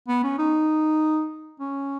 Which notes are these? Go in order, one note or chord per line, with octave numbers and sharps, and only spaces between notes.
B3
C#4
D#4
C#4